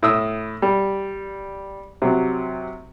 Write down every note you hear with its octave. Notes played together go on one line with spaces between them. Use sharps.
A2 D#6 E6
G3
C3 F#3